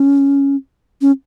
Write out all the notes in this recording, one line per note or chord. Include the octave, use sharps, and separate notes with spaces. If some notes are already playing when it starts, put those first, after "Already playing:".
Already playing: C#4
C#4